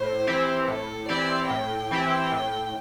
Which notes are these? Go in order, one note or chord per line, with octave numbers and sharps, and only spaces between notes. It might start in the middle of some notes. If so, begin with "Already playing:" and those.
Already playing: A2 C5
E3 C4 E4 G4
A2 A4
E3 C4 E4 G4 D5
A2 G5
E3 C4 E4 G4
A2